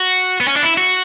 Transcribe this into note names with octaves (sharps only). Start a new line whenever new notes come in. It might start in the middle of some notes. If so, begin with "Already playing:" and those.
Already playing: F#4
B3
C#4
D4
E4
F#4